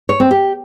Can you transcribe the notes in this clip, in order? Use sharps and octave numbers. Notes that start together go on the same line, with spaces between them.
C#5
C4
G4